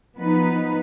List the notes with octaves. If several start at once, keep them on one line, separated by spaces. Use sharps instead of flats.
F3 B3 D#4 B4